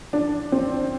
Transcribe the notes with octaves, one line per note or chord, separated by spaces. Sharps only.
D4
C4